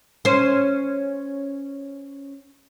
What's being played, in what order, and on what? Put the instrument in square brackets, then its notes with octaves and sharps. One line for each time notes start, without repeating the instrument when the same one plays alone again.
[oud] C#4 C5